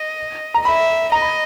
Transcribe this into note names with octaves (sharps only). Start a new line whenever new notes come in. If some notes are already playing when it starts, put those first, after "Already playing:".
Already playing: D#5
A#5
E5 B5
D#5 A#5
B5